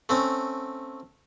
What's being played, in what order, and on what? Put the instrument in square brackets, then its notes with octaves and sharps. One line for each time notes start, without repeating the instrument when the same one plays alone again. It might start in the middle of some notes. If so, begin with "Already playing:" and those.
[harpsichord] A3 C4 C#4